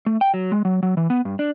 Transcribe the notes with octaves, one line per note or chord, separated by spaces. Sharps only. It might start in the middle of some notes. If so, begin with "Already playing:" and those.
A3
G5
F#3
G#3
F#3
F#3
E3
B3
G2
D4